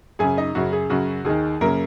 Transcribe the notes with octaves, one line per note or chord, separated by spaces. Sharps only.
F#2 C#3 G#4 G#5
D#4 D#5
F#2 C#3 F#4
G#4
F#2 C#3 F#4
D#2 D#3 G#4
F#2 C#3 A#3 A#4